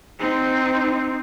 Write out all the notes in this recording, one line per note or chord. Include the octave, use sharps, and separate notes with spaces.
C4 D#4